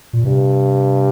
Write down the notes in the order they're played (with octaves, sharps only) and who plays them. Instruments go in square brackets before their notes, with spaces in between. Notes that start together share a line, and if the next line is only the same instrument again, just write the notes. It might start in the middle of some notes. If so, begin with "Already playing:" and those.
[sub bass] A#2
[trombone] G2 [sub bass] C3